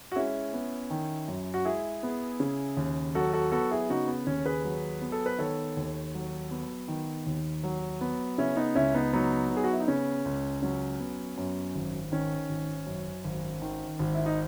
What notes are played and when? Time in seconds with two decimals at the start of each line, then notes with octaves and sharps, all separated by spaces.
0.12 F#4
0.16 G#3 C#4 E4
0.53 B3
0.90 D#3
1.28 F#2
1.54 F#4
1.65 G#3 E4 G#4
2.03 B3
2.40 C#3
2.77 D#2
3.15 F#3 F#4 A4
3.33 F#4 A4
3.52 B3 F#4 A4
3.71 E4 G#4
3.90 C#3 D#4 F#4
4.08 B3
4.27 D#2 C#4
4.46 G#4 B4
4.64 F#3
5.01 B3
5.12 A4
5.26 B4
5.39 D#3 A4 C#5
5.77 D#2
6.14 F#3
6.51 B3
6.88 D#3
7.26 D#2
7.64 F#3
8.01 B3
8.38 C#3 C#4 E4
8.57 B3 D#4
8.75 C#2 C#4 E4
8.94 B3 D#4
9.13 F#3 B3 D#4
9.50 B3
9.57 G#4
9.64 F#4
9.72 E4
9.80 D#4
9.88 C#3 C#4
10.25 C#2
10.62 F#3 C#4
11.00 B3
11.38 F#2
11.75 G#1
12.12 D#3 C#4
12.49 G#1
12.87 F#2
13.24 G#1
13.62 D#3
13.99 G#1
14.15 E4
14.26 D#4